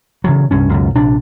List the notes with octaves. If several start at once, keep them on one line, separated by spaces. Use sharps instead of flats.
C#3 E3 F#3
C2 G2 C#4
C#2 F#2 B2
A#1 C3 D4